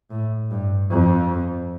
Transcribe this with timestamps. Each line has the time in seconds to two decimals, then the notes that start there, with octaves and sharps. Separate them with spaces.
0.11 A2
0.51 G2
0.90 F2